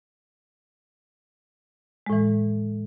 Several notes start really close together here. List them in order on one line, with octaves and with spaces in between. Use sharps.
G#3 A2 E3